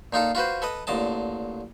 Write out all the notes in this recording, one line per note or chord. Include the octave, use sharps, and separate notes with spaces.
A#2 D#4 F4 A4
F4 F#4 B4 C5
A4 B4 D#5
A1 A#2 D3 D#5 A5